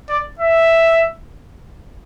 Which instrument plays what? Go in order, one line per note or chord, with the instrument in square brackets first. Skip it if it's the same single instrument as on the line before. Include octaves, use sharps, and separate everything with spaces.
[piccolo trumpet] D5
E5